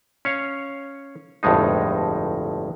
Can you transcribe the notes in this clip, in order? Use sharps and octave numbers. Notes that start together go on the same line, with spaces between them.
C#4 C#5 F5
G1 F2 A2 G#3 D#4